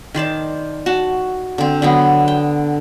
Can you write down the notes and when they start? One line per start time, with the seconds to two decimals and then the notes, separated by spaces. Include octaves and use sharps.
0.14 D#3 C5 D5 A5
0.86 F#4 A5
1.58 D3 C4
1.82 D3 F#3 B3
2.28 G5